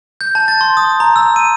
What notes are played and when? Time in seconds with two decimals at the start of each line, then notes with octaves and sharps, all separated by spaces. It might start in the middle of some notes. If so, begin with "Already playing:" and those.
0.21 G6
0.35 A5
0.48 A6
0.61 C6
0.77 D#6
1.00 A#5
1.16 E6
1.36 D#7